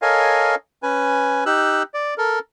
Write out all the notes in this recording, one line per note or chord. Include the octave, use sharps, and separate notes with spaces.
A4 A#4 C#5 D#5 F5 G#5
C#4 B4 G#5
D#4 G4 E6 F#6
D5
A4 A#4